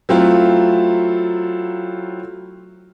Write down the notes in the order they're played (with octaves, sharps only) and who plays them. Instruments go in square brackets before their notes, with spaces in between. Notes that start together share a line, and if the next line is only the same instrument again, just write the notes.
[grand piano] F#3 A3 C4 E4 F4